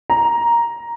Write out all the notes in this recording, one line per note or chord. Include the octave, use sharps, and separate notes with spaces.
A#5